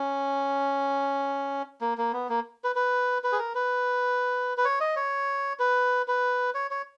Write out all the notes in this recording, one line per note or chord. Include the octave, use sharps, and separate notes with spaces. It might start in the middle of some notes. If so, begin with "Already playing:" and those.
Already playing: C#4
A#3
A#3
B3
A#3
B4
B4
B4
G#4
A#4
B4
B4
C#5
D#5
C#5
B4
B4
C#5
C#5